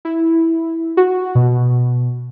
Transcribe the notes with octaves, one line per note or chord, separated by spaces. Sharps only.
E4
F#4
B2